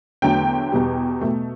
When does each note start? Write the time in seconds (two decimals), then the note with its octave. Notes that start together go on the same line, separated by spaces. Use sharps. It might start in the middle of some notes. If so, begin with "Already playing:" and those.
0.22 E2 D3 F#3 A3 G5
0.72 E2 B2 G3
1.21 B2 A3